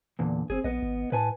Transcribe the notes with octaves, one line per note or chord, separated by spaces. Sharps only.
E2 A#2 D3
F#1 C4 G#4
A#1 B3 D#5
G#1
A2 B4 G#5 A5